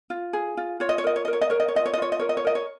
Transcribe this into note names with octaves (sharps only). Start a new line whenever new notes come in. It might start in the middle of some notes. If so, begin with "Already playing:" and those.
F4
G#4
F4
F4 C#5
D#5
C#5
A#4 D#5
C#5
D#5
A#4
C#5
D#5
A#4 C#5
D#5
C#5
F4 D#5
C#5
D#5
F4 C#5
D#5
A#4 C#5
D#5
C#5
A#4 D#5
C#5